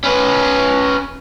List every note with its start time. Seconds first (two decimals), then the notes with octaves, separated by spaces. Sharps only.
0.04 C#4 B4